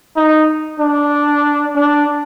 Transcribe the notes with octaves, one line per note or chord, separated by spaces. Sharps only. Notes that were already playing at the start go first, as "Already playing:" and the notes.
D#4
D4
D4